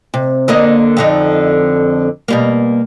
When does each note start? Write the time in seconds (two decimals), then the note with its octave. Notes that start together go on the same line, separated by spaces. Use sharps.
0.14 C3
0.48 D3 A#3 D#5
0.97 F2 D3 D#4
2.28 B2 G3 A#3